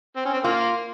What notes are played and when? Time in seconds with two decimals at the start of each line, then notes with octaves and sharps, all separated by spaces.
0.16 C4
0.25 C#4
0.33 C4
0.44 A#3 F4